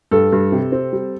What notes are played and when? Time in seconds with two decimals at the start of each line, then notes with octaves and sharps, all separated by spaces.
0.11 G2 A4
0.33 G2
0.52 C3
0.72 C4
0.93 G3